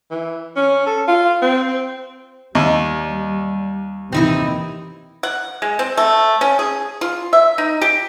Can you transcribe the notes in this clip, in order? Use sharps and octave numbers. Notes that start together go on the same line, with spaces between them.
E3
C#4
A4
F4
C4
D#2 G3
D#2 C3 E3 C4 D#4 E4
F#5
G#3
C4
A3
C#4
G#4
F4
E5
D#4
G4